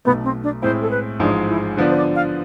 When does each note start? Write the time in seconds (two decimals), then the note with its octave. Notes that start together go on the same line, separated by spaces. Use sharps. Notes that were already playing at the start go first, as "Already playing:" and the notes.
0.05 B1 B2 A3 B3
0.24 C4
0.44 D4
0.62 A2 G#3 C4 E4 C5
0.81 A4
0.91 B4
1.19 A1 G#2 F3 G#3 D4
1.49 E4
1.77 D3 F3 B3 D4 C5
1.90 C5
1.97 D5
2.16 F5